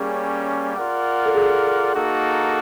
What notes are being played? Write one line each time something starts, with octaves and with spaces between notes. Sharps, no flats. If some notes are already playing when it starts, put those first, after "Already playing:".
Already playing: G3 A#3 C#4 G#4
F4 A#4 D5 F#5
A4
G#4
A#3 D#4 F#4 A4